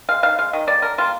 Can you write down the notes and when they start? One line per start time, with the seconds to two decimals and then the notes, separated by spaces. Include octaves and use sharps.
0.09 G#3 F5
0.23 D#3 F5
0.38 G#3 F5
0.53 D#3 D#5
0.67 G3 A#3 D5
0.82 D3 A#4
0.98 G3 A#3 F4